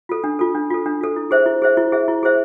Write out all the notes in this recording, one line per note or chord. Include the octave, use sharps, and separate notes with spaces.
F4 A4
D4
F4 A4
D4
F4 A4
D4
F4 A4
E4
G#4 C5 E5
E4
G#4 C5 E5
E4
G#4 C5 E5
E4
G#4 C5 E5